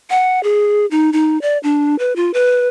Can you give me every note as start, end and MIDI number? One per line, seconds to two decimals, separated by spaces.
0.10 0.42 78
0.43 0.86 68
0.91 1.13 63
1.13 1.40 63
1.42 1.58 74
1.63 1.96 62
1.99 2.13 71
2.16 2.33 65
2.34 2.69 71